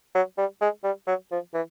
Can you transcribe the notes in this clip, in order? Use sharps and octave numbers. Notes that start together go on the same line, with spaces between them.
F#3
G3
G#3
G3
F#3
F3
E3